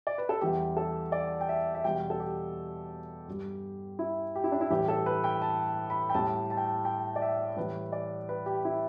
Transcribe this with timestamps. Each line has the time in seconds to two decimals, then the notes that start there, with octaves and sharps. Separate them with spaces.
0.07 D5
0.18 B4
0.29 A4
0.41 E2 E3 G3 G4
0.77 A4
1.12 D5
1.41 G5
1.49 E5
1.74 E5
1.84 E2 B2 G3 G5
2.10 A4
2.20 G4
3.27 G2 G3
3.99 E4
4.35 G4
4.44 E4
4.52 D4
4.61 E4
4.70 A2 E3 G3 G4
4.88 A4
5.06 B4
5.24 G5
5.42 A5
5.90 B5
6.10 G5
6.14 A2 G3 A5
6.50 A5
6.57 G5
6.66 A5
6.85 G5
7.16 D5
7.22 E5
7.57 A2 E3 G3 B4
7.92 D5
8.29 B4
8.46 G4
8.65 E4